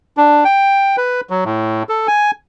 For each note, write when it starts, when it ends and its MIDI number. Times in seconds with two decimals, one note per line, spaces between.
0.17 0.44 62
0.45 0.96 79
0.97 1.21 71
1.30 1.44 54
1.45 1.83 45
1.89 2.07 69
2.08 2.31 80